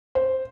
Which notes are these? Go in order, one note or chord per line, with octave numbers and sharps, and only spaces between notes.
C5